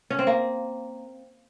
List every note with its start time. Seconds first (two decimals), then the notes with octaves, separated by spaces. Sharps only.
0.10 C#4
0.19 C4
0.27 A#3